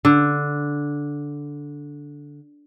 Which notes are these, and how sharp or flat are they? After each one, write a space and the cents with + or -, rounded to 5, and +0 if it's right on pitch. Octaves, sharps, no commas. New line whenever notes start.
D3 -10